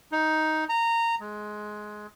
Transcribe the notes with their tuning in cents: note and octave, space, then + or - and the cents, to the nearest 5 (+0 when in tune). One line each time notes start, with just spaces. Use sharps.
D#4 +10
A#5 -15
G#3 +15